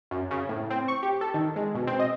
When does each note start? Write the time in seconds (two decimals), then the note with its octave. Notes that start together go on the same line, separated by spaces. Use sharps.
0.11 F#2
0.31 C#3
0.49 A2
0.71 C4
0.88 C#6
1.03 G4
1.21 A4
1.34 D#3
1.56 G#3
1.75 B2
1.87 C4
1.99 D#5